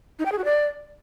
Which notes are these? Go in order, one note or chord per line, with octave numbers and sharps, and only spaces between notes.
D#4
G5
G#4
F#4
D5